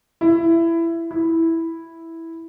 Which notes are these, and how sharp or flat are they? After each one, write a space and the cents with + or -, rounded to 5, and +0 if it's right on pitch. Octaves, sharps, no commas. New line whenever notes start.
E4 +15
E4 -5